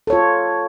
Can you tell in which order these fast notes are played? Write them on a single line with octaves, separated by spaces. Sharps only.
A4 C#5 F4